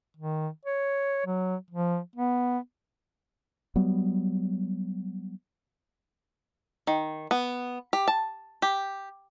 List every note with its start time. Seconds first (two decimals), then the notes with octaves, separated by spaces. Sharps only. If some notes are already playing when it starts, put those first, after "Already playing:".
0.17 D#3
0.65 C#5
1.26 F#3
1.71 F3
2.16 B3
3.76 F#3 G3 B3
6.87 D#3
7.31 B3
7.93 G4
8.08 A5
8.62 G4